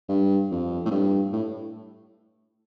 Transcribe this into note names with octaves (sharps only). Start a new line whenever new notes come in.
G2
F2
A2
G2
A2